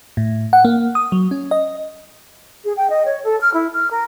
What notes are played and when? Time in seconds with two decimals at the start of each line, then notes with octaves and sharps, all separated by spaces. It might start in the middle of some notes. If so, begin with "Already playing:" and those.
0.17 A2
0.53 F#5
0.65 A#3
0.95 D#6
1.12 F#3
1.31 C#4
1.51 D#5
2.64 G#4
2.76 G5
2.90 D#5
3.07 C#5
3.24 A4
3.41 F6
3.53 E4
3.73 F6
3.91 A#4